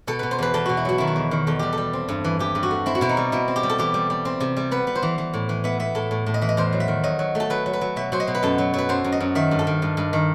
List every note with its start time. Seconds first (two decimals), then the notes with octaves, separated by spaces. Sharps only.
0.07 B2 A4
0.19 B2 B4
0.31 C5
0.38 E2 B4
0.54 E2 A4
0.66 B2 F#4
0.77 E4
0.85 F#3 F#4
0.98 D#3 E4
1.07 F#4
1.16 E2
1.31 D#3
1.47 E2 A4
1.59 G3 G4
1.73 G3 A4
1.93 C4
2.09 G2
2.24 E3
2.39 E3 G4
2.55 G2
2.63 F#4
2.71 A3
2.86 C4 E4
2.95 F#4
3.01 B2 E4
3.09 D#4
3.17 G3
3.32 B2 E4
3.48 C4
3.56 G4
3.63 G3
3.69 A4
3.78 E3 G4
3.94 G3
4.10 G3
4.25 C4
4.40 C3
4.57 G3
4.71 B3 B4
4.87 B3
4.95 C5
5.02 E3
5.18 E3
5.34 A2
5.49 E3
5.64 B3 E5
5.79 B3 E5
5.95 A2 A4
6.11 A2
6.26 A2
6.34 D#5
6.41 E3 E5
6.49 D#5
6.57 E2 C5
6.73 F#3
6.80 E5
6.88 D#3
7.04 F#3 D#5
7.19 F#3
7.35 A3
7.40 A4
7.50 F#3 B4
7.66 F#3
7.73 B4
7.81 F#3
7.96 B2 E5
8.12 F#3 C5
8.20 D#5
8.27 B2
8.35 B4
8.43 F#2 A4
8.58 F#3
8.74 F#3 B4
8.89 F#2 C5
9.04 F#2
9.12 D#5
9.20 F#2
9.35 D#3 E5
9.51 G2
9.59 A4
9.67 D#3
9.82 G2
9.97 G2
10.13 D#3